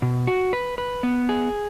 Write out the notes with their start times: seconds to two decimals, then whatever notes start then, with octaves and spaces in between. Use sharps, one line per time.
0.02 B2
0.27 F#4
0.53 B4
0.78 B4
1.03 B3
1.29 G#4